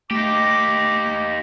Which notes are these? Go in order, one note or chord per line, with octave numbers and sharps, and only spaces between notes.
A3 D#4 G4 D6